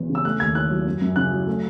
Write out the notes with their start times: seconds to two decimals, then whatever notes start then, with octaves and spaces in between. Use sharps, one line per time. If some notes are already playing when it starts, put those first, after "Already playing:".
Already playing: E1 E2 E3 G#3
0.10 C#3
0.15 E6
0.25 A3 F#6
0.40 D#2 G#6
0.55 D#3 F#6
0.70 F#3
0.86 F#2
1.01 F#2
1.16 C#3 F#6
1.32 F#3
1.47 A3